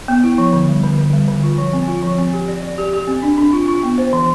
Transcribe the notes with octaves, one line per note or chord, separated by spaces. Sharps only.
B3
E4
F3
D3
G3
D3
D3
G3
D3
F4
F3
C4
F4
F3
C4
G4
D5
D5
G4
G4
C4
D4
D4
F4
F4
B3
C5
E3